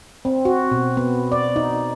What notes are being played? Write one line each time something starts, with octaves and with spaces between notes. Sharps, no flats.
C4
F#4
B2
B3
D5
D#4